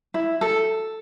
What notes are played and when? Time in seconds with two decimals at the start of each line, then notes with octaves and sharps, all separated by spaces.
0.14 E4
0.41 A4